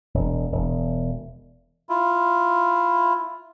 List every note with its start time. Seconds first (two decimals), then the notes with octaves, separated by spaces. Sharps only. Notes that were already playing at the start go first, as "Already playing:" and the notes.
0.14 E1
0.52 E1
1.89 E4 F4